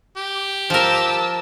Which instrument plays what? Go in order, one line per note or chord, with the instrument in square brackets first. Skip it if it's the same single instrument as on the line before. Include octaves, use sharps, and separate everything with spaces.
[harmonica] G4
[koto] F3 A#4 [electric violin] A5 E6